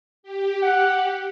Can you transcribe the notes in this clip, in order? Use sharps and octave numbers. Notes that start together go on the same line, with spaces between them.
G4
F#5